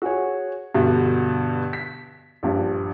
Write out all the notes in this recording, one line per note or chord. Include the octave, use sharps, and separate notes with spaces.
F#4 G#4 C#5
G2 B2 D3
B6
A#1 G2